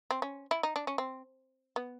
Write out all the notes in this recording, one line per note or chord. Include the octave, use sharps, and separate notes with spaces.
C4
C#4
E4
D#4
D4
C#4
C4
B3